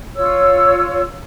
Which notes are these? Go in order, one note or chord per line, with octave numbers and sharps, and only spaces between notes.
F4 C#5 E6